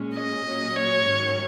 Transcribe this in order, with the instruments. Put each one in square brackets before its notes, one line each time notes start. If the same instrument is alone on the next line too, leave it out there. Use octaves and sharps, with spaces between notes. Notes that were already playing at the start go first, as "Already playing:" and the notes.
Already playing: [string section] A#2 G#3 C#4
[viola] D#5
[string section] A#2 F#3 C#4
[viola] C#5
[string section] G#2 D#3 F#3 C#4